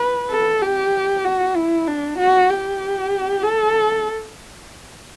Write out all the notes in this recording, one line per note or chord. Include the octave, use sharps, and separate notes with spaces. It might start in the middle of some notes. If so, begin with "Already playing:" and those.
Already playing: B4
A4
G4
F#4
E4
D4
F#4
G4
A4